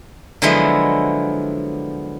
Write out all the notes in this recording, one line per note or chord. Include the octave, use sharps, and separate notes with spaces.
D3 F3 F#3 G#3 B3 E4